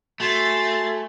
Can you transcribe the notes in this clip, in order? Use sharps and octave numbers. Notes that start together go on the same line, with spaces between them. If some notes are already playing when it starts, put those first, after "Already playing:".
A3 F#4 G#5 C6 A6